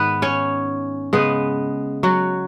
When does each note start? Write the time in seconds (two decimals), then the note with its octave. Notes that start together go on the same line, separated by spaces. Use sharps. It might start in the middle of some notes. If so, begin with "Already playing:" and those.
Already playing: G#2 D#3 B3 B4
0.22 C#4 C#5
1.13 C#3 G#3 B3 B4
2.03 F#3 F#4